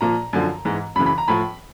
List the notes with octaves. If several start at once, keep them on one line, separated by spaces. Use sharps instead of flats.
A#2 F3 A#5
F#2 D3 F3
G#2 E3
F#2 C#3 E3 B5
B5
A#5
A2 F3 B5